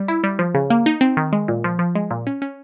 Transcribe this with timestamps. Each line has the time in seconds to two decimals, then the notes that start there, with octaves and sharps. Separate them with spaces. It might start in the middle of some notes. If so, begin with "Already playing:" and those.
Already playing: G3
0.08 E4
0.24 G3
0.39 F3
0.55 C#3
0.70 A#3
0.86 D#4
1.01 C4
1.17 D#3
1.33 G#3
1.48 A#2
1.64 F3
1.79 F3
1.95 G#3
2.11 A#2
2.27 C#4
2.42 C#4